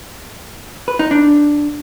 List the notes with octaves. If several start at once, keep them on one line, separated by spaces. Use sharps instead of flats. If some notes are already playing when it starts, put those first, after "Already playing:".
B4
D#4
D4